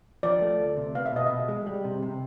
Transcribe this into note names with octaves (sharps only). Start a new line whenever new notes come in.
F3 D5
A3
D2
C3
B3 F5
E5
B2 D#5
B2 E5
G#3
G3
C3
C3